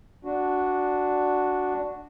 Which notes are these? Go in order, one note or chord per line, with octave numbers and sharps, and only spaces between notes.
D4 F#4